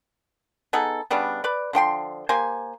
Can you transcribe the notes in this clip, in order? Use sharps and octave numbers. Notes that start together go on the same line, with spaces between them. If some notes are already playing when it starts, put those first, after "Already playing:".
B3 D#4 G#4 A4
C#3 G3 B3 D4
B4 D5
D3 F3 G5 C6
A#3 G4 C5 G#5